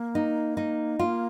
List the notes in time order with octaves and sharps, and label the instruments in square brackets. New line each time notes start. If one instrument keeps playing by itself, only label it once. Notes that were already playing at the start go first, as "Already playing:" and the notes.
Already playing: [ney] A#3
[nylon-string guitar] D#4
D#4
[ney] A#3 [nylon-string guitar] F4